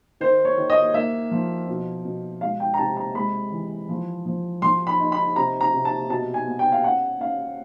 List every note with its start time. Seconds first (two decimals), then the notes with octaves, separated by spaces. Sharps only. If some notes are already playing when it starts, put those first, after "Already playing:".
0.20 D#3 C5
0.45 C#5
0.57 D#3
0.70 D#5
0.94 A#3 E5
1.32 F3
1.68 B2
2.05 B2
2.41 G#3 F5
2.60 G5
2.74 A#5
2.78 C3 A5
2.97 A#5
3.15 G#3 B5
3.52 E3
3.89 F3
4.26 F3
4.62 F3 C6
4.87 B5
5.00 D#4
5.12 B5
5.36 C3 A#5
5.61 A#5
5.73 C3
5.85 A5
6.10 B2 A5
6.34 G#5
6.47 B3
6.59 G5
6.72 F5
6.84 C#4 F#5
7.20 C#4 F5